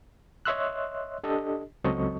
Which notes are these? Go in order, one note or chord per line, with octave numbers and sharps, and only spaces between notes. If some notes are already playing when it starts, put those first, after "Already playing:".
C#5 D#5 E5 C6 E6 F#6
D4 G4 A4 D#5
C#2 F#3 C4 A4 D#5 C#6